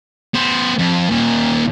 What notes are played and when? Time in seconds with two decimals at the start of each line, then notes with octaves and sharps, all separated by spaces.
0.35 B3 C5
0.79 F2
1.10 D#2 A#2